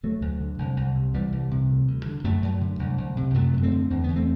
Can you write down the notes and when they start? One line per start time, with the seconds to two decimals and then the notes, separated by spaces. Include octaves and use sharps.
0.03 D2 F#3 A3
0.22 D2
0.40 D3
0.58 C2
0.77 C2
0.95 C3
1.14 C2 E3 G3
1.32 C2
1.51 C3
1.69 D2
1.88 D2
2.06 D3
2.24 F#2 F#3 A3
2.43 F#2
2.61 D3
2.79 C2
2.98 C2
3.17 C3
3.34 F#2 F#3 A3
3.54 F#2
3.63 A3 C4
3.71 D3
3.90 E2 C4
4.04 E2 B3
4.16 A3 C4